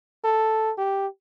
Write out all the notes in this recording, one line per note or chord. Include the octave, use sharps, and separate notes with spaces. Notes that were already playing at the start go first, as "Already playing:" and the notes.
A4
G4